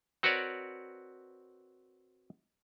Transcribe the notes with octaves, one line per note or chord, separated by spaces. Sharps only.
C4 F#4 A#4 B4 C#5 D5